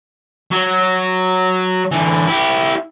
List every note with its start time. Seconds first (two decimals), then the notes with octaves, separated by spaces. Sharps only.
0.51 F#3
1.91 D3 E3
2.28 E4 G4